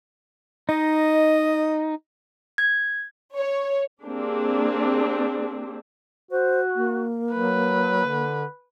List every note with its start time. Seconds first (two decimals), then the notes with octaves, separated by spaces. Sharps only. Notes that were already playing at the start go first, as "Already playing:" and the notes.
0.69 D#4 D#5
2.58 G#6
3.37 C#5
4.02 A#3 C4 D4 G4 G#4
6.31 F#4 C5
6.76 A#3
7.33 F#3 B4
8.05 D3